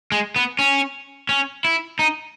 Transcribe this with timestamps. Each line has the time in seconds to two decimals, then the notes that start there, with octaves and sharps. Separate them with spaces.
0.12 G#3
0.36 B3
0.59 C#4
1.29 C#4
1.65 E4
1.99 D#4